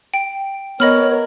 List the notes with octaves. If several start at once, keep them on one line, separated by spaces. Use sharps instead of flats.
G5
B3 A#4 C#5 D#5 B5 F6